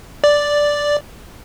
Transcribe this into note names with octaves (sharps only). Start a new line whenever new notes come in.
D5